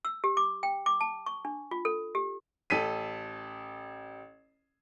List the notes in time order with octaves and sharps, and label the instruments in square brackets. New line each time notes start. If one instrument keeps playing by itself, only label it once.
[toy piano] E6
G4
D6
G5
D6
A5
C#6
D4
F4
A4
G4
[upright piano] A1 A4 B6 D#7